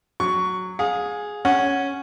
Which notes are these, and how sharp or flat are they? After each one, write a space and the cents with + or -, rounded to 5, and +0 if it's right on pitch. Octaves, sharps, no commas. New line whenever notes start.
F#3 -5 C#6 +10
G#4 +0 F5 +35
C#4 +0 F#5 +0